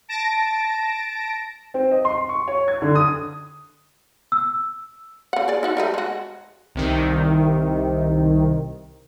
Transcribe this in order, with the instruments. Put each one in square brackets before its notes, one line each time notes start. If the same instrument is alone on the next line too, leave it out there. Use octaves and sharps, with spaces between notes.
[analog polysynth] A5 A#6 D7
[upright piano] C4
D#5
C6
C#6
C#5
G#6
D3
D#6
[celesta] E6
[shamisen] C#3 F#5
G#4 D5
D#4 F#4 F#5
G3 A3 D#4
G#3 F#4
[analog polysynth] C2 C3 D#3